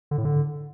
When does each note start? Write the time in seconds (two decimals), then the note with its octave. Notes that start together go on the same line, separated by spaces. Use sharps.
0.11 D3
0.18 A2
0.25 D3